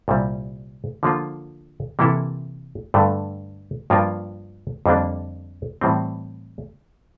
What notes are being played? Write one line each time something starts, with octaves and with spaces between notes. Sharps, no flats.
C2 A#2 G3
D3 F3 A#3 F4
C3 E3 A#3 E4 A4
G2 D3 A3
G2 F3 A#3 F4 A#4
F2 D3 G3 A#3 D4
A2 E3 G3 C4